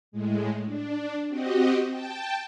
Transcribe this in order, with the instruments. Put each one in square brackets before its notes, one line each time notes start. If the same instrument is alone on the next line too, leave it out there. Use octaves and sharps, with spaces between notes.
[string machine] A2 G#3
D4
C4 F#4 G4 D#5
G5 A5